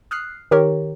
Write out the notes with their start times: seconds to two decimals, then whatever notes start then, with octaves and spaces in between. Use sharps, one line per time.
0.11 D#6 F6 F#6 C7
0.51 D#3 G4 A#4 C#5